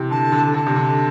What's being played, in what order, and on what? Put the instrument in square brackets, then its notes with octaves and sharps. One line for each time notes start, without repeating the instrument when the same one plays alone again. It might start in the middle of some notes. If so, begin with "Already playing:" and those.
Already playing: [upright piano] C3 E3
[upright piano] D3 [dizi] A5
[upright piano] D3
[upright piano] D3 [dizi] A5
[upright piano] C3
D3